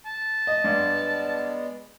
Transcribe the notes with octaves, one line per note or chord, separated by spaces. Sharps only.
A5
D#5
G2 G#3 B3 D5